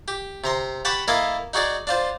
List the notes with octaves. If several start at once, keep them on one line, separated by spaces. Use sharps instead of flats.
G4
C3 A#5 C6
G4 F#5 A5 B5 C#6
A#3 E4 A4 D#5 F5 G#5
D#4 F#4 G#4 D5
D4 F4 C5